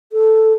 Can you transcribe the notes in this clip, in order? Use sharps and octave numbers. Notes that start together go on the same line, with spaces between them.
A4